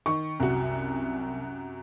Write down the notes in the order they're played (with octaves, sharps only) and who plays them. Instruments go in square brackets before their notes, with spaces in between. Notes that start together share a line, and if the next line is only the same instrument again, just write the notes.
[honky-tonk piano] D#3 [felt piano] C#6
[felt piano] C2 [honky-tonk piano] F#2 C3 F#4